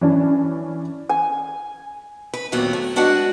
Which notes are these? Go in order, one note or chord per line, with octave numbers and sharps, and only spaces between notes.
E3 C#4 D4
G#5
B4
D#2 A#2 F#3 B3 C4
A3
G#3 D4 F#4 B4 D5 F#5